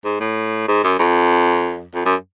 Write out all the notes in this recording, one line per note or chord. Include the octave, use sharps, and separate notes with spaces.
G#2
A2
G#2
F#2
F2
F2
F#2